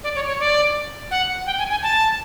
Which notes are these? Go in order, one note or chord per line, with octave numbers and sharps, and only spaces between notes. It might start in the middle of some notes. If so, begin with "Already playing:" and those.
D5
C#5
C#5
D5
F#5
G5
G#5
G#5
A5